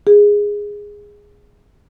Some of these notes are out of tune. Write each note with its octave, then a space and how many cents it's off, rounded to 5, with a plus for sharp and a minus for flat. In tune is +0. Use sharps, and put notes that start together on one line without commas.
G#4 -10